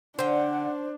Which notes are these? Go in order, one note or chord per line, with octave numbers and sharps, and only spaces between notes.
D3 D4 C5 F#5 G5